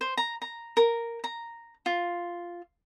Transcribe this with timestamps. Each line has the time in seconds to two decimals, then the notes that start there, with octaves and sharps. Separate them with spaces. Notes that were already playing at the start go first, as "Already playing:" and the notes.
0.01 C5
0.17 A#5
0.42 A#5
0.77 A#4
1.24 A#5
1.86 F4